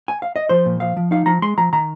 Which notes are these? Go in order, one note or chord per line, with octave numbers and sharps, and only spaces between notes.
G#5
F5
D#5
F3 C5
A#2
F3 F5
F3
D#4 F5
F3 A#5
G#3 C6
F3 A#5
D#3 A#5